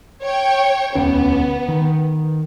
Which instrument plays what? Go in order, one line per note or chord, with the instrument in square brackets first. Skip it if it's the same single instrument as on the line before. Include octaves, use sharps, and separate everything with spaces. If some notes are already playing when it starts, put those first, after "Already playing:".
[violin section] C#5 G5
[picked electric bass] E1 D2 C#4 [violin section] B3
[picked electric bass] D#3